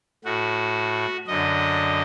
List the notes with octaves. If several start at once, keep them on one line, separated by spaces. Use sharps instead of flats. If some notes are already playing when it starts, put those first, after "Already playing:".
A2 F#4
F#2 D3 D#5